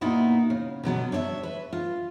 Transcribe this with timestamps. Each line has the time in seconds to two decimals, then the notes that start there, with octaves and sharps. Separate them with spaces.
0.01 A#2 B3 D#4 E4 F#4
0.50 C#3
0.84 B2 D3 F#3 B3
1.12 D4 C#5 D#5 E5
1.43 B4
1.73 F4